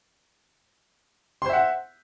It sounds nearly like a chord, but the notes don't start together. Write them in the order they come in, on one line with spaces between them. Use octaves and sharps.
C6 C5 E5 F#5